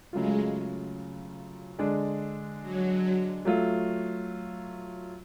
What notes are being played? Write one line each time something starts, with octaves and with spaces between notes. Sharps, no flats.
C#3 F#3 G#3 A3 F4
D3 G#3 D4
F#3
F#3 A3 F4